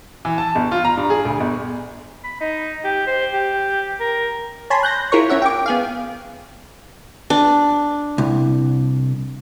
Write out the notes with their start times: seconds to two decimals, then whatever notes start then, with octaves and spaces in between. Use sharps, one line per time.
0.25 E3
0.38 A5
0.55 G1
0.71 F4
0.85 A#5
0.97 G2
1.10 G#4
1.25 D2
1.40 G1
2.24 B5
2.41 D#4
2.84 G4
3.07 C5
3.33 G4
4.00 A#4
4.70 C#5 G#5 A5 B5 C6
4.83 F#6 G6 A#6
5.12 E4 F4 G#4 A#4 C#5 C#6
5.29 C#4 C#5 E5 F#5
5.42 G5 D6
5.66 B3 G#4 F5
7.30 D4
8.18 C2